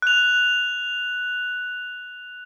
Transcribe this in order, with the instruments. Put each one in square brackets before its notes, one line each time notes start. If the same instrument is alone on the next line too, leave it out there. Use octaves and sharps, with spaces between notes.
[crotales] F#6 F7